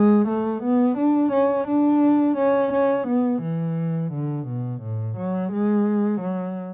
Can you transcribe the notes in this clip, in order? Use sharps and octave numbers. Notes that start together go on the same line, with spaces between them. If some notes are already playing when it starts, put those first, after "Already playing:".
Already playing: G#3
A3
B3
D4
C#4
D4
C#4
C#4
B3
E3
D3
B2
A2
F#3
G#3
F#3